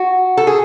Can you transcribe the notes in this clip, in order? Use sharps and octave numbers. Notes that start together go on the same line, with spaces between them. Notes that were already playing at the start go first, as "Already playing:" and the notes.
Already playing: F#4
A4
G#4